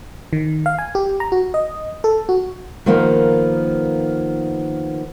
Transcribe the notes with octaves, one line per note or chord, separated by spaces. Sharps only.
D#3
F5
G#5
G4
A#5
F#4
D#5
A4
F#4
D#3 F3 A#3 B3 A#4